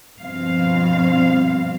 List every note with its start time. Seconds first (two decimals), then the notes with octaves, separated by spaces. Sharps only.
0.20 G2 B2 F3 C4 F5